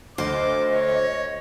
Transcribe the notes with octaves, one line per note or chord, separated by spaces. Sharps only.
D2 C5 D#5 D6
C#5